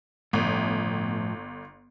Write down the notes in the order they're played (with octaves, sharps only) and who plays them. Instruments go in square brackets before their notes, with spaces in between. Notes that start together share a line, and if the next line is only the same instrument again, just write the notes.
[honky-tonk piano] G1 [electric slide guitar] A2 F3